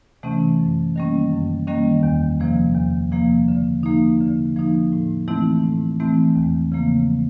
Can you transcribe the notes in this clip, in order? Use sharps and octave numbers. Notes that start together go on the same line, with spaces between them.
C3 E3 A3 C#4
F#2
D#3 G3 A#3 C#4
F#2
D#3 G3 A#3 C#4
E2
C3 F3 A#3
E2
C3 F3 A#3
D3
F3 A#3 D#4
D3
F3 A#3 D#4
A2
E3 A3 C4 E4
A2
E3 A3 C4 E4
E2
C#3 F3 A#3